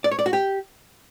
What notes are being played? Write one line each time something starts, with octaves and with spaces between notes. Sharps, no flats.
D5
C#5
D5
F#4
G4